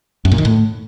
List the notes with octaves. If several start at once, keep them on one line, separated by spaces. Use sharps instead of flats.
F#2
A#2
D#3
A2